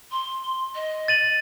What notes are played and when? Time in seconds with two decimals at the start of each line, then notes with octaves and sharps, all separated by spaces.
0.12 C6
0.75 D#5
1.08 A6 D#7 F#7